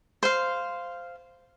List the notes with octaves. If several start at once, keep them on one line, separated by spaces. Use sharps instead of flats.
C5 F5